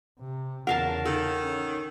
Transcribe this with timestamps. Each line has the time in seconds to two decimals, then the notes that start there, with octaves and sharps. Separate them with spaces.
0.20 C3
0.67 E2 C#3 A#4 F5 F#5 A5
1.05 D#3 A4
1.40 C#4